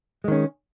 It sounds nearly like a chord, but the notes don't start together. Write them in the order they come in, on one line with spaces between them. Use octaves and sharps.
G#3 D#3 C#4